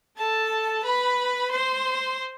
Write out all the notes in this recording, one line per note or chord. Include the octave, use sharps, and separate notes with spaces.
A4 A5
B4 B5
C5 C6